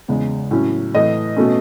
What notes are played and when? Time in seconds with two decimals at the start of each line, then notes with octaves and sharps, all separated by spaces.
0.08 E2 C#3 G#3
0.51 A2 F#3 C#4
0.95 A2 E3 A3 D#5
1.36 B2 A3 C#4